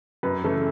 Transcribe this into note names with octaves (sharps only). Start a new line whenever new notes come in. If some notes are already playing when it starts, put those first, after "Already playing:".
F#2 B4
C#3 E3 A3